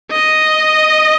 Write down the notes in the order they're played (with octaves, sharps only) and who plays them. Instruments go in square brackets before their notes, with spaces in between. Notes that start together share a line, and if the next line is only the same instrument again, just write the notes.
[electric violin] D#5